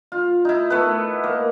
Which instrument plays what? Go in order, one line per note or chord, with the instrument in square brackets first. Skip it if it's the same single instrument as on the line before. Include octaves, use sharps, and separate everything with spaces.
[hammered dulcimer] F4
D#4 E4
A3 B3 B4
A#3